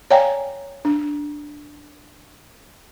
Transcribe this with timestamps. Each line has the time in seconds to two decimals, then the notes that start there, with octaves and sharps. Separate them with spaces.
0.11 C#5 D5 F5 G5 G#5 A#5
0.85 D4